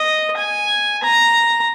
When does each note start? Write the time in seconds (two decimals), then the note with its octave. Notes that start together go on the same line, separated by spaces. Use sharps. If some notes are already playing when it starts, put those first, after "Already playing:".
Already playing: D#5
0.37 G#5
1.03 A#5